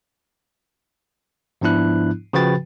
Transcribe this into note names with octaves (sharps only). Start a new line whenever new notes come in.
G#2 F3 B3 D4 E4 F#6
C#3 F3 F#4 B4 G5 A6